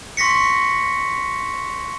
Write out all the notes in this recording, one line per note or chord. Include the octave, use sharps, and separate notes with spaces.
C6 C#6 A#6 B6 C#7